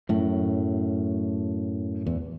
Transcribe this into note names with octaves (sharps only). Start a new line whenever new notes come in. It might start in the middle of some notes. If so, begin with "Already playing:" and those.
F#2 A2
E2